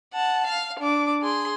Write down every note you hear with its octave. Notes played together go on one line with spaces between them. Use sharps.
F#5 A5
F5
D4 D6
G#4 C6